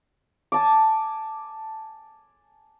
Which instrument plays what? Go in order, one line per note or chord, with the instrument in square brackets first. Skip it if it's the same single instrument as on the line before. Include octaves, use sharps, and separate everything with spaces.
[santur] G#5 A5 D6